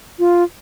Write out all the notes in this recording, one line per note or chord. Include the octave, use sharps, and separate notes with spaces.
F4